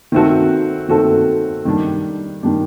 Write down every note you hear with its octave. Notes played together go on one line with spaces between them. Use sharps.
D#3 A3 C4 F#4 A4
D#3 A3 C4 F#4 A4
D#3 G3 D4
D#3 G3 D4